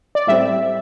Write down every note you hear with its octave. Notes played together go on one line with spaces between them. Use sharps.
D5
A2 G3 C4 E5